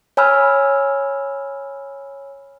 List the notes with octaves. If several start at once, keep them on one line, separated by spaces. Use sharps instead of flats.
C#5 G#5 B5 E6 F6